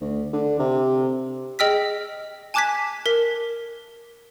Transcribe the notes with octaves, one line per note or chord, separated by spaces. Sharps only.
D2
D3
C3
G#4 D#5 G5 E6 F6 B6
G#5 A5 D6 F#6 G#6 B6
A#4 B6